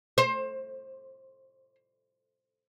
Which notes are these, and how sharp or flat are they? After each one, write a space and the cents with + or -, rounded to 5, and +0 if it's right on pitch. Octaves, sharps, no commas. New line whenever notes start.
C5 +25